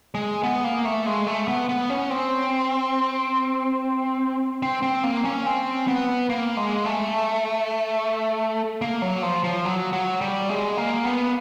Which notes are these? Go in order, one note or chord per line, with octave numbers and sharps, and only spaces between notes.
G#3
B3
A#3
A3
G#3
A3
B3
B3
C#4
C4
C4
C4
A#3
C#4
C4
B3
A#3
G#3
A3
A#3
F#3
F3
F3
F#3
F#3
G3
G#3
A#3
B3